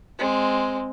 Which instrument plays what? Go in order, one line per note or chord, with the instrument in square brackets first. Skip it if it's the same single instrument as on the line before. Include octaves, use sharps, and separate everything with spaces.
[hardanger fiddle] G#3 C4